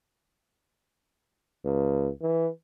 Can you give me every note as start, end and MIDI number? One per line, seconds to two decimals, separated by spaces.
1.65 2.09 37
2.22 2.48 52